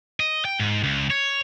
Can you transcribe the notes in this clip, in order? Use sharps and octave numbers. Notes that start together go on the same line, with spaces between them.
D#5
G5
G#2
C#2
C#5